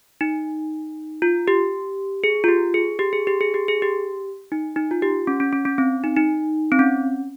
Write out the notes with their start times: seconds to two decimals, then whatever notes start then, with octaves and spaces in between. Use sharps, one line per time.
0.21 D#4
1.22 F4
1.48 G4
2.24 G#4
2.44 F4
2.48 G4
2.74 G#4
2.99 G4
3.13 G#4
3.27 G4
3.41 G#4
3.54 G4
3.68 G#4
3.82 G4
4.52 D#4
4.76 D#4
4.91 F4
5.02 G4
5.27 C#4
5.40 C#4
5.53 C#4
5.65 C#4
5.78 C4
6.04 D#4
6.16 D#4
6.72 C4
6.79 C#4